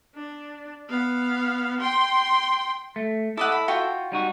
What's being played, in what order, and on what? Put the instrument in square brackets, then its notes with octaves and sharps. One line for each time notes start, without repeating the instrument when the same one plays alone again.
[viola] D4
B3 F5
G5 C6
[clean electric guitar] A3
[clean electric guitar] E4 A4 [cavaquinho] D5 D#5 F#5
[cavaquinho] B5
F4 F#4 G5
[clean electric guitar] G3 D#4 F#4